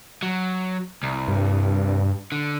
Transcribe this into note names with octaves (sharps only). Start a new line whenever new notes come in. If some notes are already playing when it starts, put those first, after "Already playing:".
F#3
C2
G2
D3